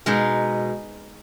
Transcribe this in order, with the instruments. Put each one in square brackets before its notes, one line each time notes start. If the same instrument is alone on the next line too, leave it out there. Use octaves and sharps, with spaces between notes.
[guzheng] B2 G#3 D#4 A#4